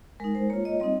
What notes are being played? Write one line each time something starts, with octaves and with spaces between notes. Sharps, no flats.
G#3 D#4 A#4
C5
A#3 F4 C#5
D#5
G3 C4 D#4 D#5